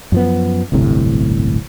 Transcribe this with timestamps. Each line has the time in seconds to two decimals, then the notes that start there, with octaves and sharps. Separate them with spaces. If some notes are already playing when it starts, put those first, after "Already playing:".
0.12 F#2 F3 B3
0.72 D1 G1 A2 C3